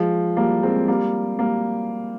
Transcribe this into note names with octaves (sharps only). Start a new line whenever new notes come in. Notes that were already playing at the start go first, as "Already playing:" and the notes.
Already playing: F3 G#3
G3 A#3
G#3 C4
G3 A#3
G3 A#3